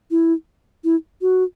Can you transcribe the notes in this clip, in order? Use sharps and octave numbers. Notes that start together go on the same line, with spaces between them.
E4
E4
F#4